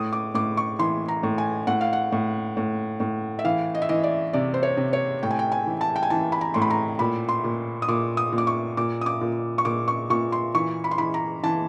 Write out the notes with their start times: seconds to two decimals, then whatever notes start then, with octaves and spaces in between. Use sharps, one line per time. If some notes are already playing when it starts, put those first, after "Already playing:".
Already playing: A2 D#6
0.13 D6
0.34 A2 D6
0.57 C#6
0.79 E3 C6
1.08 A#5
1.23 A2
1.38 G#5
1.67 A2 F#5
1.81 F5
1.93 F#5
2.12 A2
2.57 A2
3.00 A2
3.39 E5
3.45 E3 F5
3.75 D#5
3.82 E5
3.89 E3 D#5
4.03 D5
4.33 C3 D5
4.54 C5
4.63 C#5
4.77 C3
4.93 C#5
5.23 A2 G5
5.31 G#5
5.39 G5
5.52 G#5
5.67 E3
5.81 A5
5.96 G5
6.03 G#5
6.10 E3 A5
6.32 B5
6.41 A#5
6.54 A2 C6
6.62 B5
6.70 A#5
6.99 A#2 B5
7.29 C6
7.44 A#2
7.82 D#6
7.88 A#2 D6
8.17 D#6
8.32 A#2
8.38 D6
8.47 C#6
8.77 A#2 D6
9.01 D#6
9.06 D6
9.21 A#2
9.58 C#6
9.65 A#2 D6
9.88 C#6
10.10 A#2 C#6
10.32 C6
10.55 E3 C#6
10.84 B5
10.91 C6
10.98 E3 B5
11.14 A#5
11.44 E3 A5